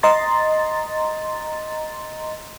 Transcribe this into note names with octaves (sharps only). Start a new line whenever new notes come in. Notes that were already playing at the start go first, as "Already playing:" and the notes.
D#5 A#5 C6 A6